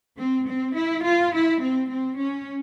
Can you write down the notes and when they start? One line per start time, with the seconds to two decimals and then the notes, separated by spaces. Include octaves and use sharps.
0.19 C4
0.47 C4
0.76 E4
1.05 F4
1.33 E4
1.62 C4
1.90 C4
2.19 C#4